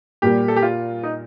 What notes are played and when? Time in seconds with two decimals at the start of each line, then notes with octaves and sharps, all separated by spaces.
0.22 A#2 G3 A#3 G4
0.48 A4
0.56 G4
0.63 F4
1.03 D#4